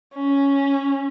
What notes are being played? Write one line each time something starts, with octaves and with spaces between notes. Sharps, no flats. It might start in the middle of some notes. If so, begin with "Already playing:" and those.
C#4